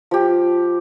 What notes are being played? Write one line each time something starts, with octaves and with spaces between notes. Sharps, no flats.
F3 G4